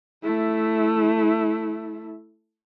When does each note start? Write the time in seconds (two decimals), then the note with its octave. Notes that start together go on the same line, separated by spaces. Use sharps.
0.23 A3 E4